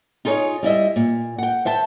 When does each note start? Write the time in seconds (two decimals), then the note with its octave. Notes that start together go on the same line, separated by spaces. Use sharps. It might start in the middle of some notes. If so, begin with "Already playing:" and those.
0.25 D#4 F4 G#4 B4 C#5
0.63 G3 E4 D#5 E5
0.96 A#2
1.38 F#5 G5
1.65 C5 E5 G5 A5